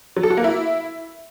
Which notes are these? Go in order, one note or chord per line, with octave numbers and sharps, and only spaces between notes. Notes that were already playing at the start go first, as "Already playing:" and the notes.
F#3
A4
F#4
A#3
E4